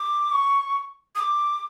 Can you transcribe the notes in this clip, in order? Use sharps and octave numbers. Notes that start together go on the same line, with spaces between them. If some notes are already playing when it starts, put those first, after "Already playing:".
Already playing: D6
C#6
D#6
D6